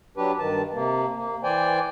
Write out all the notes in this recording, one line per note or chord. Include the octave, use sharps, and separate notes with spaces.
F#3 D4 G4 B4
G2 D#3 A5
C3 A#3
A#3
E3 C5 D5 G5 G#5